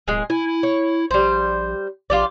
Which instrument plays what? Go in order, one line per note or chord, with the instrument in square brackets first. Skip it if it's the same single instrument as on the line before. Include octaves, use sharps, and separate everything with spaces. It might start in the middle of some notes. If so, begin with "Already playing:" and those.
[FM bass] D1 [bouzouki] G#3 G#4
[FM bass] E4 [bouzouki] G#5
[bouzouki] C#5
[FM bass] A#1 [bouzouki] G3 C5
[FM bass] A#1 [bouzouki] F4 G4 D5